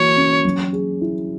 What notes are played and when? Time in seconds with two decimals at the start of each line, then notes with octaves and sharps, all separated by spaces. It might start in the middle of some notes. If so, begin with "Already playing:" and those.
Already playing: E3 A#3 F#4 C#5
0.16 C#4
0.45 F#3
0.73 G#4
1.01 E4